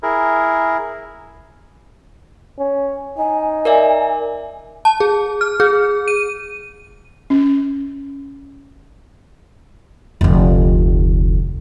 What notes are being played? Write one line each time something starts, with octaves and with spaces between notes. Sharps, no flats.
E4 G#4 A#4
C#4
D#4 G#5
A#4 D5 E5
A5
G#4
F6
G#4
D#7
C#4
F1 D2